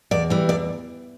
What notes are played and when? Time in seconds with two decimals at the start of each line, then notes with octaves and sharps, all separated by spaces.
0.11 E2 D5
0.30 E3 G3
0.49 E2 D5